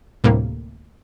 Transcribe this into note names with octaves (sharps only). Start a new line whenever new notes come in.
D2 A2 C3 G3 A#3